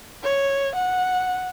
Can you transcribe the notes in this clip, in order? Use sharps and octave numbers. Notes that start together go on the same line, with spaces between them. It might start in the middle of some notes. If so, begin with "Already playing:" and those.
C#5
F#5